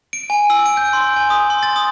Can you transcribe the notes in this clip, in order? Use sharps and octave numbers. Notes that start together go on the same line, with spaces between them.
D7
G#5
E6
D7
G6
C6
G#5
D#6
C6
A6
D#6